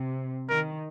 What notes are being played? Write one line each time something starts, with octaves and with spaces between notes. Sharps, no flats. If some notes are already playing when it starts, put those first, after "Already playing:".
Already playing: C3
D#3 A#4